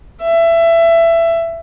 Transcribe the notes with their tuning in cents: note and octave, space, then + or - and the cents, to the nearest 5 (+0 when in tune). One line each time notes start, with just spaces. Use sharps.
E5 +20